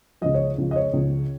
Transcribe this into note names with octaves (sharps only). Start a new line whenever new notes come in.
C#2 C#3 F3 D#5
C#5
C#2 C#3 F3
D#5
C#5
C#2 C#3 F3